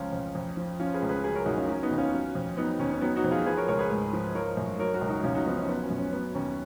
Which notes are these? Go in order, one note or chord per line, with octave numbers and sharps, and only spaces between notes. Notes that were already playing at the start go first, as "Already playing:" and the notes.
Already playing: C#2 F3 C#4 F4
F2
F2
F3
F3 C#4 F4
G#4 B4
C#2
G#4 B4
F#3 G#4 B4
A#4 C#5
F#2 D#4 F#4
C#4 F4
F#3 C#4
B3 D#4
D#2
C#4 F4
F#3
F2
F#3 B3 D#4
D#2 C#4
C#4
F#3 B3 D#4
D#4 F#4
F2
F4 G#4
F3 G#4 B4
A#4 C#5
C#2 A#4 C#5
G#4 B4
G#2
F3
F3 A#4 C#5
F#2
F#3 A#4 C#5
F#4 A#4
C#2
D#4 F#4
F#2 C#4 F4
D#4 F#4
F3 B3 D#4
C#4
F#3 B3
C#4
F#2
C#4
F#3 B3
D#2 C#4